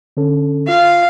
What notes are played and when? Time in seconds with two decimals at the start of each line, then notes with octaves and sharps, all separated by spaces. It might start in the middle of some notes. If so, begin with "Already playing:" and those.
0.17 D3 C#4 A4
0.68 F4 F5